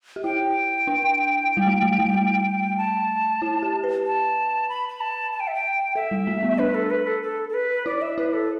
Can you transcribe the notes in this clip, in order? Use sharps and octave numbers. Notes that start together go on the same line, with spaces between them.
G4
E4 G5
D4
G3
A3
G3
G3
A3
A5
E4
G4
B4
A5
B5
B5
A5
A5
G5
E5
G5
A4 E5
G3
A3
B3
D4 B4
A4
B4
A4
A4
A4
B4
E4 D5
E5
E4 B4
A4